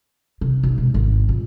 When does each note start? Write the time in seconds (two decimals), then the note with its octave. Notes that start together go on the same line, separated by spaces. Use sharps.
0.41 C3
0.63 B1
0.78 G#2
0.94 G#1
1.29 A#1